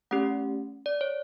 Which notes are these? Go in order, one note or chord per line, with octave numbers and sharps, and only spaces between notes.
A3 C#4 G4 F#5
D5
C#5